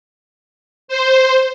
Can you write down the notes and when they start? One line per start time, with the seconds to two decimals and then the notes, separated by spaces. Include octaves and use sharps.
0.88 C5